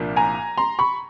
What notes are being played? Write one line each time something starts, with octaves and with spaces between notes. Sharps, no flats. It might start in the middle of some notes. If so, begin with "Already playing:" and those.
Already playing: C2 A#2 F3 A#3 D4
G#5 A#5
A#5 C6
B5 C#6